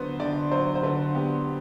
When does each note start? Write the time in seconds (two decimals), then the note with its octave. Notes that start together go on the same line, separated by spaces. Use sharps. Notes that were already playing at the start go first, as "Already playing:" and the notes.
Already playing: D3 F#3 B3 B4 C5
0.20 D3 D5
0.51 F#3 C5
0.75 C5
0.83 D3 B4
1.15 B3 G4